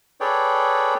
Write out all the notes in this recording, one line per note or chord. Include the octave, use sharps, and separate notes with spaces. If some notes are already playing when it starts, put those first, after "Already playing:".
G#4 A4 B4 C#5 D5 G5